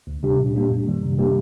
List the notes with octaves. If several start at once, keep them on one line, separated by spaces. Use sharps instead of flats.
D2
C3 G3 D4 G4
A#2
G3 A#3 D4 G4
F#2
D#3 G3
C3
G3 A#3 D4 G4